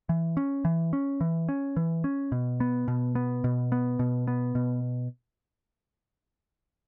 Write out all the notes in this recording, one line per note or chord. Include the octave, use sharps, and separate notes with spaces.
E3
C#4
E3
C#4
E3
C#4
E3
C#4
B2
B3
B2
B3
B2
B3
B2
B3
B2